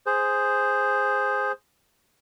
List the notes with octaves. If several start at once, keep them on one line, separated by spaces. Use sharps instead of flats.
G#4 C5